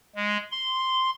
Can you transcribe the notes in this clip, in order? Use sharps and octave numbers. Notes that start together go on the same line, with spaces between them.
G#3
C6